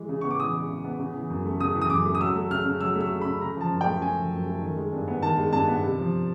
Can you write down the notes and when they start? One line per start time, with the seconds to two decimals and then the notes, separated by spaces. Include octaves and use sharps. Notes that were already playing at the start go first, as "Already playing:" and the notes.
Already playing: E3 G#3
0.09 C#3
0.21 B3 C#6
0.31 D6
0.40 E3 D#6
0.54 G#3
0.69 C#3
0.84 B3
1.00 C#3
1.14 E3
1.30 F#2
1.45 A3
1.60 C#3 D#6
1.75 E3
1.82 D#6
1.90 F#2 D6
2.06 A3
2.15 D#6
2.21 F#3 E6
2.35 A3
2.50 C#3 F6
2.66 C#3
2.80 F#3 E6
2.96 A3
3.01 E6
3.11 C#3
3.21 C#3 B5
3.41 C#3 A#5
3.57 F3 A5
3.71 F#2
3.81 G5
3.87 A3
4.01 C#3 G#5
4.17 F3
4.32 F#2
4.46 A3
4.62 D#3
4.77 G#3
4.92 G2
5.08 B3
5.22 D#3 A5
5.37 G#3
5.53 G2 A5
5.68 B3
5.83 C3
5.98 F3